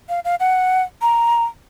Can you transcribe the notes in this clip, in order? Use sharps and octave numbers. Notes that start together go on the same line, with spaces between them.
F5
F5
F#5
A#5